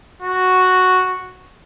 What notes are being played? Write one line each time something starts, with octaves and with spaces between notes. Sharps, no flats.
F#4